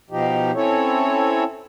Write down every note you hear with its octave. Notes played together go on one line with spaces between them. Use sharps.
B2 F3 D#4 G4
C4 C#4 E4 A4 C#5